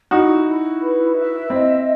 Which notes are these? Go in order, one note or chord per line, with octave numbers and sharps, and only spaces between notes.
D#4 E4 F#4
E4
B4
E5
C4 E4 D#5